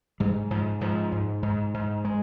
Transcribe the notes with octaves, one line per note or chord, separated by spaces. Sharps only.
G#2 G3
G#2 F3
G#2 F3
G#2
G#2
G#2
G#3